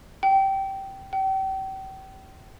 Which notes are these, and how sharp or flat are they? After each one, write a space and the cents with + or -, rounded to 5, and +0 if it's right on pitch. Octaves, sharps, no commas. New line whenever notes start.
G5 -15
G5 -35